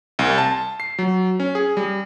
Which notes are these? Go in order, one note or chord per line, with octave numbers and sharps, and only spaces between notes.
C2
A5
C7
F#3
C#4
G#4
G3